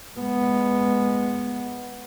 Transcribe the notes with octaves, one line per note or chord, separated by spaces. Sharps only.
G#3 B3